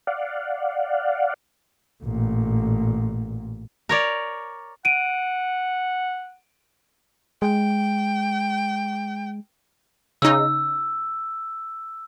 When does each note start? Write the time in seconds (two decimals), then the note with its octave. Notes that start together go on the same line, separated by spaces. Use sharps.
0.07 D5 F5 F#5
2.04 A1 A#2
3.89 A#4 C#5 D5
4.85 F#5 D7 D#7
7.42 G#3 G5
10.22 C#3 D#4 E6